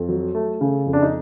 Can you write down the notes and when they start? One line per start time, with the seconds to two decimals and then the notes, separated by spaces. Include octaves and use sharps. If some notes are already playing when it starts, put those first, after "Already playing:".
Already playing: F2
0.09 F#3
0.35 A3
0.61 C#3
0.86 F2
0.93 D4
1.02 D#4